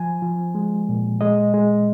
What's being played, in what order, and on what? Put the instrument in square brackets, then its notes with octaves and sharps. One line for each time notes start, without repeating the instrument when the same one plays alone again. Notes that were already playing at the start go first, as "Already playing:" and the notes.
Already playing: [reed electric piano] F3 G#5
F3
G#3
A#2
G#3 D#5
G#3